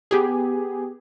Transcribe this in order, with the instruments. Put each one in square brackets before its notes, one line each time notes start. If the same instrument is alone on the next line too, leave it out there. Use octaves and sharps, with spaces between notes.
[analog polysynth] B3 G4 G#4